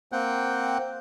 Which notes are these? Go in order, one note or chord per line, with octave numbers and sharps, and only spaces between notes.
A#3 C4 F#5 G5